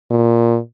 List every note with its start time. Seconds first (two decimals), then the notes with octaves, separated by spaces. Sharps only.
0.11 A#2